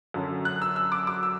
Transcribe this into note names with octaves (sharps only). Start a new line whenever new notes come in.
F#2 D3 F#3 C#4
F#6
E6
E6
D6
D6
E6